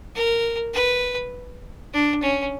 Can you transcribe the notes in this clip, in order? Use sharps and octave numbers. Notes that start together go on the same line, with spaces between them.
A#4
B4
D4
C#4